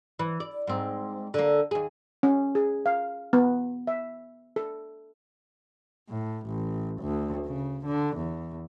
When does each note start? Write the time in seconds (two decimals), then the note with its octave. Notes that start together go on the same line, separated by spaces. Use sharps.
0.19 E3
0.40 D5
0.67 G#2 C4
1.34 D3 A#3
1.71 D#2 G#4
2.23 C#4
2.55 G#4
2.86 F5
3.33 B3
3.87 E5
4.56 A4
6.09 A2
6.46 A1
7.01 D2
7.46 C#3
7.86 D3
8.17 E2